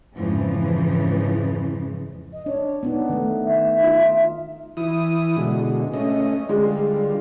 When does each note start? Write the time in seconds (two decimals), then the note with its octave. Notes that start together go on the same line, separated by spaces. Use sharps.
0.16 F2 G#2 C#3 E3 F3
2.32 D#5
2.46 D4 C#5
2.83 B3 D4 D#4
3.09 D#3 A3
3.44 E5
3.80 D#4 F4
4.77 E3 E4 D#6
5.37 B2 D3 G#3
5.93 A3 C#4 D#5
6.49 D3 G3 G#3 F4